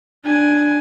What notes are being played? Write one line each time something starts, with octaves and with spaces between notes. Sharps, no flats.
D4 G#5